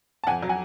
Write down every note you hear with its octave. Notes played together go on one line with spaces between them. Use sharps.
A5
F2 F#5 G#5
F#3
F#5 G#5